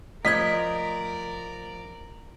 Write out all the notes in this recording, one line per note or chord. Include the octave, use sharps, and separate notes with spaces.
F3 A3 A#4 D5 D#5 D#6 G#6 B6